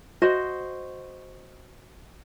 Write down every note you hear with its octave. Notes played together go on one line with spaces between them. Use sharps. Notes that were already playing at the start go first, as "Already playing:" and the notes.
F#4 C5 D#5